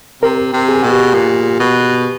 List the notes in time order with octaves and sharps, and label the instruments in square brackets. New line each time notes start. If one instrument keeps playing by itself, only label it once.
[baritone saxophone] C3 [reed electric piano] A#4
[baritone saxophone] C3
[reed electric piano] G#4
[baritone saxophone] B2
[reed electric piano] G4
[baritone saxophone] A#2
B2